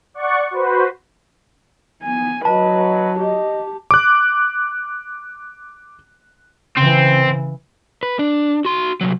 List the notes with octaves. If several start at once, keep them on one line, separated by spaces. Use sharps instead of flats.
D5 F#5 C#6
F#4 B4 C5
B3 G#5
F#3 B4 D#5 A5
G4 D#5
D6 F#6
C#3 E3 C4
B4
D4
F#4 C6
C2 F#3